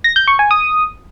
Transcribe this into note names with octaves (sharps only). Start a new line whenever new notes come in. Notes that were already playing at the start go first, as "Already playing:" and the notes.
A#6
G6
C#6
G#5
D#6